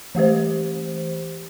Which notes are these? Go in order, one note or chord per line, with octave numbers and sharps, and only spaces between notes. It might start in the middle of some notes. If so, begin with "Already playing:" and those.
E3 A3 G4 C5